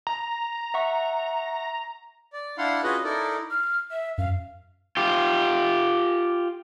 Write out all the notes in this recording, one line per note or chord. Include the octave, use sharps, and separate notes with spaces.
A#5
E5 F#5 C#6
D5
D4 E4 F5 F#5 C6
C#4 F4 F#4 G#4 B4 D#5
D#4 E4 A4 A#4 D5
F6
E5
F#2 F5
F4 G4